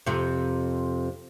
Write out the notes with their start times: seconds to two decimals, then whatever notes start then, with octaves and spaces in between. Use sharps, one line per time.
0.06 F2 C3